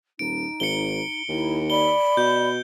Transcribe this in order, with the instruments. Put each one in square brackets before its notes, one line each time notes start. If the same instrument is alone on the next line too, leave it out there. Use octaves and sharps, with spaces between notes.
[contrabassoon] D#1 [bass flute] D#4 [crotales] D7
[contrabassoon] G#1 [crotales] C#7 G7
[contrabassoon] D#2 [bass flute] D#4 [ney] E4
[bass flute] D5 [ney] B5 [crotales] G7
[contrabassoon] B2 [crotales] G6